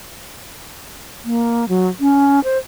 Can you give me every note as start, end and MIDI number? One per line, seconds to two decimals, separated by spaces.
1.25 1.68 58
1.68 1.88 54
2.00 2.43 61
2.44 2.58 72